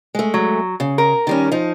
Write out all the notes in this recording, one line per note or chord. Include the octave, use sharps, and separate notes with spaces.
G#3 A3
F#3
C#3
A#4
D#3 G3 C#4
F3 D#4